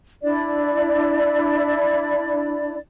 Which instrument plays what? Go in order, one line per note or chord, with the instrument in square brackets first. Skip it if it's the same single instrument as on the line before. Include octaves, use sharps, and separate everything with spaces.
[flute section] D4 E4 D5